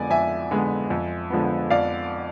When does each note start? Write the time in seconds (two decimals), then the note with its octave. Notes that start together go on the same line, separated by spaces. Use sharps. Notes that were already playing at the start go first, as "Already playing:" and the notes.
Already playing: F2 D3 G#3 B3 D5 G#5
0.10 F2 E5 G#5
0.51 D3 G#3 B3
0.90 F2
1.30 D3 F3 G#3 B3
1.70 F2 D5 F5